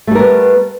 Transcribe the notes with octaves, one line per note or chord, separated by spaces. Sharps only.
G3 A3 B3 A#4